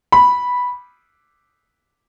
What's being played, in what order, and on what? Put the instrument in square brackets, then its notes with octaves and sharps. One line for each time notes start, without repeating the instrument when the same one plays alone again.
[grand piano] B5